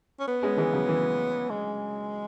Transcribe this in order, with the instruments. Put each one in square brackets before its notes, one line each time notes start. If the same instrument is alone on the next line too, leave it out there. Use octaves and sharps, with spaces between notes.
[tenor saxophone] C#4
B3
[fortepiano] G#3 C#4
E3 G#3
C#3 F#3
E3
[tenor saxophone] G#3